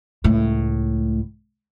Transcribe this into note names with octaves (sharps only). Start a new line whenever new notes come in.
C#2 A2